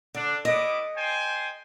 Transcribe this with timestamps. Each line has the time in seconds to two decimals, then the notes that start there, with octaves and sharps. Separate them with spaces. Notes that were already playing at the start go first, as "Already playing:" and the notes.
0.15 D3 D4
0.45 B3 E4 D#5 D6
0.96 C5 G5 G#5